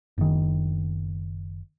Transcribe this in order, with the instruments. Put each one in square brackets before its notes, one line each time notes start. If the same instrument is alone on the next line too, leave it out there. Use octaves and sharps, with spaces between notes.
[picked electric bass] F#1 D#3